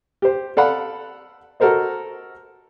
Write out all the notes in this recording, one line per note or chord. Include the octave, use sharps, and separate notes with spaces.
G4 C5
A4 D5 F5 F#5 B5
F#4 A4 A#4 C5 D#5